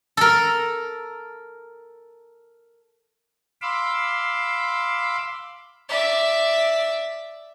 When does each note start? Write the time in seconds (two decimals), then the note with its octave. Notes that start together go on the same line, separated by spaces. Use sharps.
0.17 A4 A#4
3.62 F5 B5 C6 D6 E6
5.89 D5 E5